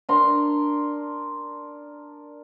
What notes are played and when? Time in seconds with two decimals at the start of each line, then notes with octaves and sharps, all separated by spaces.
0.09 D4 A#4 A#5 C6